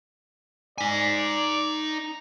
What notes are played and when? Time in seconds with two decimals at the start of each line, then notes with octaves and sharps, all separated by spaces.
0.78 D#4 D5 G#5